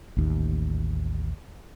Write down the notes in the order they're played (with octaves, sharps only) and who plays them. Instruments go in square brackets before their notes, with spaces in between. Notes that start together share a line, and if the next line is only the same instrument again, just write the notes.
[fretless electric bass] A1 D#2